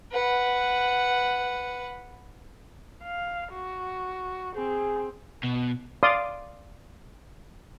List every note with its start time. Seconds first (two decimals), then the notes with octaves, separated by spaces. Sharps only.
0.12 B4 F#5
3.03 F5
3.52 F#4
4.56 C4 G#4
5.44 B2
6.03 D5 F5 C6 D#6